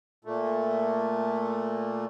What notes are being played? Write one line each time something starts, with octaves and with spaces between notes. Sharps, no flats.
A#2 A3